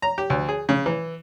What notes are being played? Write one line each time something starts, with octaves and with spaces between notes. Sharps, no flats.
A#5
G4
D2
G#4
C#3
E3